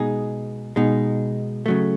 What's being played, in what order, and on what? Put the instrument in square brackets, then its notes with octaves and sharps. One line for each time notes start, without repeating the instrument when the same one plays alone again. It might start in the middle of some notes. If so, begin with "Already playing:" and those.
Already playing: [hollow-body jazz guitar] B2 G#3 D#4 G#4
B2 G#3 D#4
C#3 F#3 A3